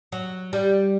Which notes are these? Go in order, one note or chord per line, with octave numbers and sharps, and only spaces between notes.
F#3
G3